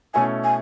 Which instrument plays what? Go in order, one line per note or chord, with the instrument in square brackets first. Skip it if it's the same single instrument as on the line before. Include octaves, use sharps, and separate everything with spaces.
[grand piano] B2 A3 C#4 E4 [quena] G#5
[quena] G#5